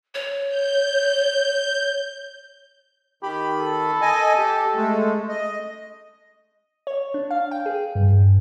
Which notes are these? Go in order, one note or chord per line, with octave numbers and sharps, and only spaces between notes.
C#5
G6
D#3 G4 B5
A4
D#5 G#5
G4
G#3 A3
D#5
C#5
D4
F5
G5
G#4
G2
G2